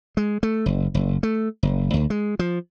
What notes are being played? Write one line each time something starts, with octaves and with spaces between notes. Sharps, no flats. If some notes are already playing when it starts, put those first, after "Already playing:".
G#3
A3
F#1
F#1
A3
F#1
D2
G#3
F3